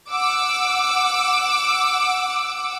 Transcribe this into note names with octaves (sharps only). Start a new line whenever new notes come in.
F#5 D6 E6